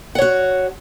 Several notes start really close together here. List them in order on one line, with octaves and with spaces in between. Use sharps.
F#5 C#5 F#4